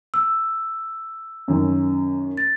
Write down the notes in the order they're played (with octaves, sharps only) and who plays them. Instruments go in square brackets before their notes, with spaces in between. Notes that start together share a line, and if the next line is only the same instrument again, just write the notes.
[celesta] E6
[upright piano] F#2 D#3 C#4
[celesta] A6